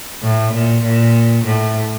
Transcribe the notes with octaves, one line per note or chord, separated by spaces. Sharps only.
A2
A#2
A#2
A2